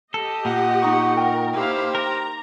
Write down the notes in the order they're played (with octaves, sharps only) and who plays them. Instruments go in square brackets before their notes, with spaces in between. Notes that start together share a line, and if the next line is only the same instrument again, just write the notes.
[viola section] G4 D#5 [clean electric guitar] A4
[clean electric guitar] A#2 [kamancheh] F#5
[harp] D#4 C#6
[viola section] A#4 [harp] G5
[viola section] A#3 E4 F5 [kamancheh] G4 C5
[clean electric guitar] A#4 [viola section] A#5